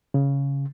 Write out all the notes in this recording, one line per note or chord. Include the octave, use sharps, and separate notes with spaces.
C#3